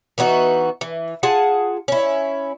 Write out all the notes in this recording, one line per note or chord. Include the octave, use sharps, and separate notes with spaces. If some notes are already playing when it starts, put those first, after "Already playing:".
E3 B3 D#4 F#4
E3
F4 G#4 F#5 A5
C#4 E4